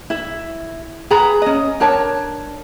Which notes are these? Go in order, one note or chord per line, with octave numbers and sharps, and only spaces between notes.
E4 E5
G#4 B4 A#5 B5
C#4 D#5
D4 A#4 C#5 A5